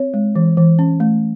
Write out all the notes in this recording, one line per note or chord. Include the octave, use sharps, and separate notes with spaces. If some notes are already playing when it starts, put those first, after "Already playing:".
Already playing: C4 C#5
G#3
E3
E3
C#4
A3